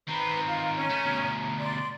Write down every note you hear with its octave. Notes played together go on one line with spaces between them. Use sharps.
D#3 C4 B4 A#5
F4
C#4
A3
D2 B2
D5 C6